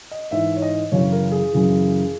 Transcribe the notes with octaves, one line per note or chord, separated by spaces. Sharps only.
D#5
G#2 E3 E5
C#5
D#5
F#2 C#3 E3 C#5
A#4
G#4
F#2 C#3 E3